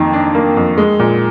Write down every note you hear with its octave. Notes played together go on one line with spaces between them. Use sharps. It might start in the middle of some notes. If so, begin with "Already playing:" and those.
Already playing: F2 D#3 A#3
D4
A#3
F2
G#3
A#2